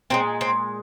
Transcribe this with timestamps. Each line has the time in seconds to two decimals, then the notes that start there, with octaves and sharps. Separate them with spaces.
0.10 A#2 F3 G#3 C4
0.41 C4